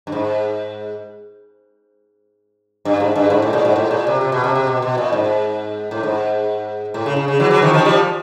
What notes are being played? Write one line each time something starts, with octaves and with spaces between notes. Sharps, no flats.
G2
G#2
G2
G#2
G2
G#2
A2
A#2
G#2
A2
A#2
C3
C3
B2
C3
C3
B2
B2
A#2
G#2
A2
G#2
A2
C#3
C#3
C#3
E3 F#3
E3 F#3
D#3 F3
D#3 F3
F3 G3